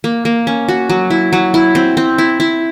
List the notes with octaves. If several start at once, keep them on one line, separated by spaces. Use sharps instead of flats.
A#3
A#3
C#4
F#4
F#3
E4
F#3
E4
C4
C4
E4
E4